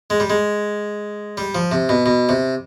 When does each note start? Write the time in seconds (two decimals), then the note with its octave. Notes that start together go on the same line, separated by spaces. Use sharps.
0.10 G#3
0.20 G3
0.30 G#3
1.37 G3
1.55 F3
1.71 C3
1.89 B2
2.06 B2
2.29 C3